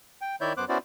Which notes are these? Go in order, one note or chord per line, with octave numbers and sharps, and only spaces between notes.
G5
D#3 E4 C#5 D5 E5 G6
F#2 B3 C5 D6 F#6
B3 C#4 E4 F#4 C5 D5